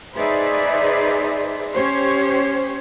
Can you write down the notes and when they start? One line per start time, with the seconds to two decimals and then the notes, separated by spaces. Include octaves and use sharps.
0.16 D#4 G#4 B4 C5 D5 E5
1.75 C#4 G4 C5 C#5